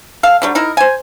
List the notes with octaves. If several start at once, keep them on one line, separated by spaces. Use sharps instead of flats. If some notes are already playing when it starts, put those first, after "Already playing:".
A4 F5
D3 F#3 G3
D#4 E4 A#4
C5 G#5